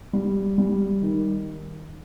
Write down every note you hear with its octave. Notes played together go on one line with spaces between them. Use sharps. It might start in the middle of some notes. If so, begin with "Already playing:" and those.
G3
G3
D#3